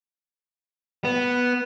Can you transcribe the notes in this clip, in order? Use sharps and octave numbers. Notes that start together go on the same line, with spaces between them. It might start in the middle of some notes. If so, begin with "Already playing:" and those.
B3